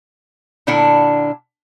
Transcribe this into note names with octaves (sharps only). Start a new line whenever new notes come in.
A#2 D3 D4 E4 F#5